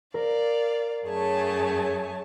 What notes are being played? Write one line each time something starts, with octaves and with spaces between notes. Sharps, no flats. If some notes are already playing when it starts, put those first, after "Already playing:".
A#4 D5 F5
F#2 A3 G#4 C#5 G#5 A5